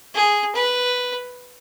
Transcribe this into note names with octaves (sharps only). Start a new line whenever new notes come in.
G#4
B4